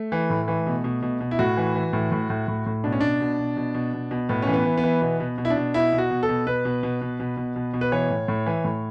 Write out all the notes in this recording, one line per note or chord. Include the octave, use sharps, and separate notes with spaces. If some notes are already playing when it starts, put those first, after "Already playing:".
Already playing: A3
E3
A2
E3
B2
B2
B2
B2
E4
A2 F#4
E3
E3
A2
A2
A2
A2
A2
B2 D4
C#4
B2 D4
B2
B2
B2
B2
B2
B2
A2 B3
E3 C#4
B3
E3
B3
E3
B2 B3
B2
B2
E4
D4
B2
B2 E4
B2
F#4
B2
A4
B2
B2 B4
B2
B2
B2
B2
B2
B2
B2
B4
E3 C#5
A2
A2
E3
A2